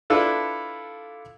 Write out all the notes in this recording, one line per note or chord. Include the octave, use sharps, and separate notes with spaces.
D4 E4 F4 A4 B4